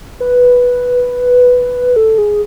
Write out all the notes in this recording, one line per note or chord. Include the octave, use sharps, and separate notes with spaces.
B4
A4
G#4